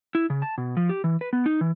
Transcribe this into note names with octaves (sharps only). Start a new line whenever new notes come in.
E4
C#3
A5
B2
F3
G4
E3
B4
B3
D#4
E3